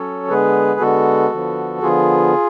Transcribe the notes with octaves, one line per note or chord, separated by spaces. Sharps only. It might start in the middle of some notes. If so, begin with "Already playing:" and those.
Already playing: F#3 C#4 A4 C#5
D3 G#3 B3 G#4 B4
D3 G#3 B3 F#4 A4
D3 F3 B3
D3 F3 B3 F4 G#4